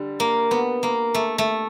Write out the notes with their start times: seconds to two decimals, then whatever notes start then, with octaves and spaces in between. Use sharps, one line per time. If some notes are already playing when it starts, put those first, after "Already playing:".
Already playing: D3 G3
0.20 A#3
0.51 B3
0.83 A#3
1.14 A3
1.38 A3